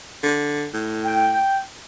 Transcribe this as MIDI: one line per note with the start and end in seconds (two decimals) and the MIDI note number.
0.23 0.67 50
0.74 1.46 45
1.04 1.59 79